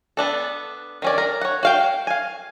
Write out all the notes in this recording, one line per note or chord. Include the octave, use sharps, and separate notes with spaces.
B3 D4 A4
D#3 C#4 D5
A#4
C#5 F#5
F#4 F5 G5
F5 G#5